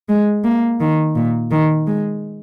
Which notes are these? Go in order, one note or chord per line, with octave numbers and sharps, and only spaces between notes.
G#3
A#3
D#3
A#2
D#3
G#3